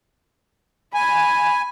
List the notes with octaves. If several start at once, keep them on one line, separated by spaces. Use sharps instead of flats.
G#5 B5